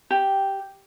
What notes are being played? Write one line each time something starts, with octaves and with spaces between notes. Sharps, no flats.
G4